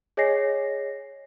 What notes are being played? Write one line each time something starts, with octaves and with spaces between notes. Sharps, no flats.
G#4 C#5 D#5 G#5 A#6 C7